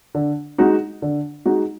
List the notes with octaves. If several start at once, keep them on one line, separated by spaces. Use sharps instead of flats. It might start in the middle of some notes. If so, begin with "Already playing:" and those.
D3
G#3 D#4 F#4
D3
G#3 D#4 F#4